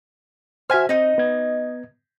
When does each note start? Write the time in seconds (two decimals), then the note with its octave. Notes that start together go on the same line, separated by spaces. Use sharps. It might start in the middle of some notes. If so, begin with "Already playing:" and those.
0.70 F#4 C5 E5 G#5 F6
0.89 C4 D#4 D#5
1.18 B3 G#6